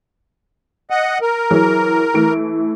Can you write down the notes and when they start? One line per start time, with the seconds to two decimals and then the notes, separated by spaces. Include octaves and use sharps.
0.90 D#5 F#5
1.21 A#4
1.50 E3 F#3 G#4
2.14 E3 A3 D7